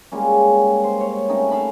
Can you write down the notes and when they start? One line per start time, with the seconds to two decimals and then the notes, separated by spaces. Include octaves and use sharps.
0.12 G3 G#3 A#3 C#4
0.84 C5
1.00 C#5
1.29 A3 C4 C#4 D#4
1.51 E5 F5 A5 B5